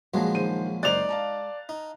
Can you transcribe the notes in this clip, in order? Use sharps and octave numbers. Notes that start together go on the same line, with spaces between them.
A#1 F3 F#3 G#3 F#4
D#3 C5 D#7
F#1 D#4 C5 D5 F#6 F7
F5 A5 A#5
D#4